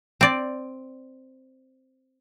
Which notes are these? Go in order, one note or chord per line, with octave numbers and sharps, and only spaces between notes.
C4 D5